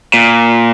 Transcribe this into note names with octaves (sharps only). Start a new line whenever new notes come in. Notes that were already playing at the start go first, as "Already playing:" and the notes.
A#2